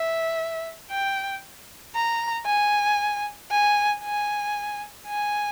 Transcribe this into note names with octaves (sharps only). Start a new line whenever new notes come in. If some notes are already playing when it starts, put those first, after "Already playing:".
Already playing: E5
G5
A#5
G#5
G#5
G#5
G#5